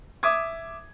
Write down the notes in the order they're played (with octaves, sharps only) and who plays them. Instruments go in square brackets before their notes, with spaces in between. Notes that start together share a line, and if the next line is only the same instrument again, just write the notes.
[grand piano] E5 D6 D#6 G#6